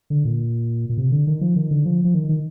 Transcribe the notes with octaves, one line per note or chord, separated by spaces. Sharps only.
D3
A#2
A#2
C3
D3
D#3
F3
D#3
D3
F3
F3
D#3
D#3